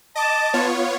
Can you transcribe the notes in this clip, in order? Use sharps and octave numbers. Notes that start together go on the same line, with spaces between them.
D#5 A5 D6
B3 F4 C#5